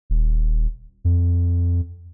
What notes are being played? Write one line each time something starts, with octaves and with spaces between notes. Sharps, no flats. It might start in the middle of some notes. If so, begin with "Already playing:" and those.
D#1
F2